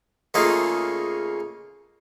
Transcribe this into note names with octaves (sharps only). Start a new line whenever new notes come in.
C#3 A3 A#3 D#4 F4 G#4